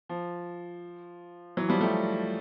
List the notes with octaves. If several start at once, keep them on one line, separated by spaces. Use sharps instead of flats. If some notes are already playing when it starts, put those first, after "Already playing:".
F3
E3 F#3
F3 G3
G3 A3